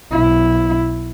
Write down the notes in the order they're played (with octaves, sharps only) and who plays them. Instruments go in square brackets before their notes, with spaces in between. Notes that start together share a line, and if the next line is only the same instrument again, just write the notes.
[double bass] B1 E4